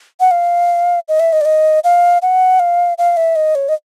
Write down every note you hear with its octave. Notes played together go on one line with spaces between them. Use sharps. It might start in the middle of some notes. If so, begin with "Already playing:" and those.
F#5
F5
D#5
E5
D#5
D5
D#5
F5
F#5
F5
F5
E5
D#5
C#5
D#5